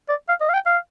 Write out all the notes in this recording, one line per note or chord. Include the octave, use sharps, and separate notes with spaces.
D5
F5
D#5
F5
G5
F5